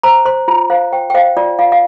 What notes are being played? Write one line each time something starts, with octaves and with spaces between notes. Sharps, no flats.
C5 A#5
C5 C6
F4 A#5
C5 F5
C5 G5
G5
C5 F5
F4 D5
F4 F5
F5